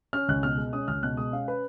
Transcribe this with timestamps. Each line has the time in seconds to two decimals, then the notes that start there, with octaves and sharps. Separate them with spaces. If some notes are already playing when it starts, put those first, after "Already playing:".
0.13 C#4 F6
0.28 C#2 F#6
0.43 B2 F6
0.58 G#3
0.73 C#4 D#6
0.88 C#2 F6
1.03 B2 F#6
1.17 G#3 D#6
1.32 C#4 F5
1.48 B4